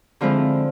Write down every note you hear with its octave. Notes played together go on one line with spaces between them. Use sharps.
D3 F3 G#3 C4 E4 F4